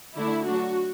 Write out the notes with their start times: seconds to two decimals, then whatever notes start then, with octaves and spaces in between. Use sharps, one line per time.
0.16 D3 A3 D4 E4
0.46 F#3 A3 D4 F#4